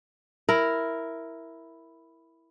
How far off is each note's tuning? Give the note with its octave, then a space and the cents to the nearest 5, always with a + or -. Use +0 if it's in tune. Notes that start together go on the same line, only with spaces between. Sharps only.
E4 +0 A#4 +0